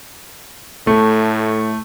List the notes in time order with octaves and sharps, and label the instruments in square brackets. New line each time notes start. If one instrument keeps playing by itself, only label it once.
[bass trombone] A2 [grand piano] A3